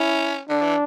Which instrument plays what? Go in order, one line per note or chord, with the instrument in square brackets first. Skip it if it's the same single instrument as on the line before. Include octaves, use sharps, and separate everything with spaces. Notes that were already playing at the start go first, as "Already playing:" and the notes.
Already playing: [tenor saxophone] C#4 [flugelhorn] E4
[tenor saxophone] D3 [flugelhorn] D4
[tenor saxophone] E3